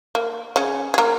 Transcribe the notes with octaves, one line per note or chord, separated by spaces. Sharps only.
A#3
C#3 C#4
G#4
A#3 A#4